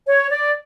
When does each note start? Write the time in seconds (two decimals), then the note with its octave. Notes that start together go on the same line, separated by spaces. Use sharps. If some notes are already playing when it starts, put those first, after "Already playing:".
0.08 C#5
0.31 D5